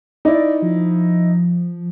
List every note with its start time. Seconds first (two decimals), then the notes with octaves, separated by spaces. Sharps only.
0.25 D#4 E4 D5
0.62 F3